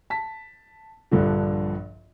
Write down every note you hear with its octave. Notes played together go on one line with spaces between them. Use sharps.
A5 B6
A#1 G2 D3 F3